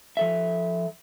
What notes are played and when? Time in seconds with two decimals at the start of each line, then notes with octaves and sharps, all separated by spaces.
0.17 F3 A4 E5